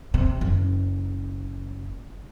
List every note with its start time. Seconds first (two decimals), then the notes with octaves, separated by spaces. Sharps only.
0.14 C3
0.41 F#1